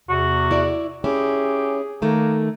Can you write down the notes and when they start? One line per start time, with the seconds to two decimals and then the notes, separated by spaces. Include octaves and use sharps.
0.09 E2 C3 F#4
0.51 E4 D5
1.04 C#4 E4 G4 G#4
2.02 D#3 A3 A#3